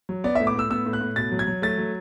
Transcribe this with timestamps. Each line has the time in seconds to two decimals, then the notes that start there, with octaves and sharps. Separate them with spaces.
0.09 F#3
0.24 B3 D5
0.35 A2 E5
0.47 D6
0.55 A2 E6
0.70 B3 E6
0.86 A2
0.93 F#6
1.01 A2
1.16 B2 A6
1.32 F#3
1.39 G#6
1.47 F#3
1.62 A3 A6
1.78 F#3